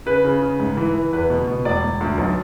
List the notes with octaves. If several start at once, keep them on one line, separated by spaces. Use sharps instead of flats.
C#3 B4
C#3
C#3
G#2
E3
E3
E2 B4
B2
B2
E1 D5
E1
D2
B1